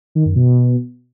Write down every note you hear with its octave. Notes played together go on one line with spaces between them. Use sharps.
D#3
F#2
B2